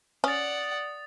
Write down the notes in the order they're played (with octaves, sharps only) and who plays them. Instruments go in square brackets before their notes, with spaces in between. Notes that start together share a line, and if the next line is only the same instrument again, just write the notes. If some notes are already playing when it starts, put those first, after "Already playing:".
[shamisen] C#4 [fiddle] D5 F#5 [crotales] D#6 A6